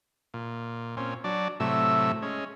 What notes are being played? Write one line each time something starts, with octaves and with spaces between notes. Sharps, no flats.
A#2
A#2 C4 C#4
F#3 D4 D5
A2 C3 F#3 A3 E6
G#3 C#4